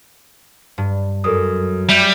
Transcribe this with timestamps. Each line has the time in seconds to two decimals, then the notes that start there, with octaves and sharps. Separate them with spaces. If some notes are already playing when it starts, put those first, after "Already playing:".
0.78 G2
1.24 F#2 A4 A#4 D#6
1.89 G3 E5 G6